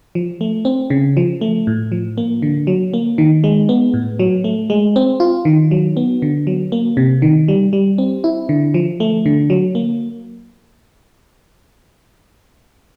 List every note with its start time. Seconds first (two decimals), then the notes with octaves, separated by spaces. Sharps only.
0.15 F3
0.41 A3
0.65 C4
0.90 C#3
1.17 F3
1.41 A3
1.67 A2
1.92 F3
2.18 A#3
2.42 D3
2.67 F#3
2.94 A#3
3.18 D#3
3.44 G#3
3.69 B3
3.94 A2
4.19 F#3
4.44 A3
4.70 G#3
4.96 C4
5.20 F4
5.45 D#3
5.71 F#3
5.97 B3
6.22 D3
6.47 F#3
6.72 A#3
6.97 C3
7.22 D#3
7.48 G3
7.73 G3
7.98 C4
8.24 E4
8.49 D3
8.74 F3
9.00 A3
9.26 D3
9.50 F#3
9.75 A#3